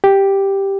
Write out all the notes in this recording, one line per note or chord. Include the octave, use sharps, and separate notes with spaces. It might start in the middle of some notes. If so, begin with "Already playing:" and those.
G4